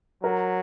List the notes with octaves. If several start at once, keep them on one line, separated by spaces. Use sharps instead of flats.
F#3 A#4